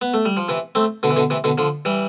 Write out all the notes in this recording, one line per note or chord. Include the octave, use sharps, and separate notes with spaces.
B3
A3
G3
F3
C3 E3
A3 C4
B2 D3
E3
B2 D3
C3 E3
B2 D3
D3 F3
E3 G3